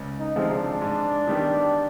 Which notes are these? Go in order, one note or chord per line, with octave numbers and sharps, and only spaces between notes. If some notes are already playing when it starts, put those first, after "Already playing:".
Already playing: C#2
D#4
C3 F3 G#3 C4
D4
G#2
D#3 G3 B3